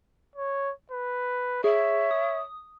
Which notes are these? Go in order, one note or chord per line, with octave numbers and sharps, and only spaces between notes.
C#5
B4
G#4 C#5 E5
D#6